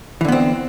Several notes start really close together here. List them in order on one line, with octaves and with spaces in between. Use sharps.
E3 D3 B3 C4